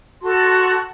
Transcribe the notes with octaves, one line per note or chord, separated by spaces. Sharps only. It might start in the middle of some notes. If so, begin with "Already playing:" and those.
F#4 A4 A5 C6